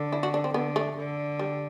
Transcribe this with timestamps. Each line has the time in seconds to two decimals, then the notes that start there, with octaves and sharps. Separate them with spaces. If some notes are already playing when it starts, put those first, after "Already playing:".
Already playing: D3
0.12 E4
0.23 F#4
0.34 D4
0.44 C4
0.54 D3 B3
0.76 A3
0.98 D3
1.39 G3